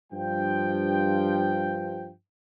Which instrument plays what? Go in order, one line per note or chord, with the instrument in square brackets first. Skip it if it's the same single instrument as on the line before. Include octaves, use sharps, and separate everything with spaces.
[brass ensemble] G2 F3 G5